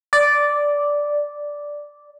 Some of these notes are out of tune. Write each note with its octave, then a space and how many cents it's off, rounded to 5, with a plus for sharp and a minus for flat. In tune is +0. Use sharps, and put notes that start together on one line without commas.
D5 -5